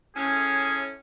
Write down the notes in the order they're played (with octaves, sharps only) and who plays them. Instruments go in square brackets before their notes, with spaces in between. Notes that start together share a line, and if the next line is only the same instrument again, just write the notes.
[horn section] A2 C#4 [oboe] G#4